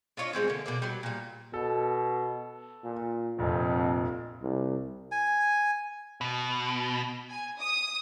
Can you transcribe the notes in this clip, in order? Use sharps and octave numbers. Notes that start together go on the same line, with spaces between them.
D4 F4 C#5 D#5
G3 G#3 C4 C#4
D3 A#3
B2 A#3 D5
F#3 G3
A#2 G3
B2 A4
A#2
F1 A#1 F2
C2
G#5
B2
G#5
D#6